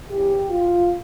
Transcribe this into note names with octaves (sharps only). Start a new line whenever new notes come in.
E2 C#3 E3 G4
F4